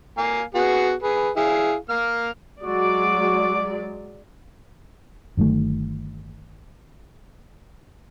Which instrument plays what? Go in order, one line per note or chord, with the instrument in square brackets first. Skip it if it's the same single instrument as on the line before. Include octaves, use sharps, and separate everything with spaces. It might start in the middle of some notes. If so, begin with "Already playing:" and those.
[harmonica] A#3 F5 G#5
B3 F#4 G#4
G#4 B4
E4 G#4 F5
A#3 F6
[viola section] F#3 G#3 D5 [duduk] F#4 [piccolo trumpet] D6
[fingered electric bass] G1 D#3 F#3 A3